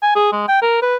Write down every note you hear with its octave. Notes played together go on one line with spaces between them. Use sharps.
G#5
G#4
G#3
G5
A#4
B4